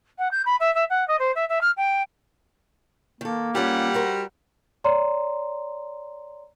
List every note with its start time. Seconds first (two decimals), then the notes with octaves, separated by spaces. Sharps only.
0.18 F#5
0.31 G6
0.45 B5
0.59 E5
0.74 E5
0.89 F#5
1.07 D#5
1.19 C5
1.35 E5
1.49 E5
1.61 F6
1.76 G5
3.21 D#3 A#3 A4
3.55 G3 C#4 F4 G4 F#5
3.94 F#4 A#4 C5
4.84 C#5 D5 A#5 C6